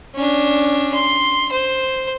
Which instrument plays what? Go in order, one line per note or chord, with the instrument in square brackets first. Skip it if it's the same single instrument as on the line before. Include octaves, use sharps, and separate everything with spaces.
[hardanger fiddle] C#4 D4
C6
C5